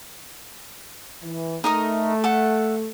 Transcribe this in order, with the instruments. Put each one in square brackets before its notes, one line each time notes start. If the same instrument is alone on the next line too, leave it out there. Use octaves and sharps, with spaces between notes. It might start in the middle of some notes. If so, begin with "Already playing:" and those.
[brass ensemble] E3
[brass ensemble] A3 [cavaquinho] D#4 A#4 D#5
[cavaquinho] A4 F#5